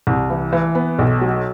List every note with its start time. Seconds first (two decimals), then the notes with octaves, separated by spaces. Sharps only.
0.07 C2
0.30 E3
0.53 E3
0.75 B3
0.99 B1
1.21 F#3